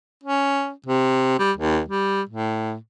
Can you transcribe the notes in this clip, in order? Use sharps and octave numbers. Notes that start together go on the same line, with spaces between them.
C#4
C3
G3
D#2
G3
A2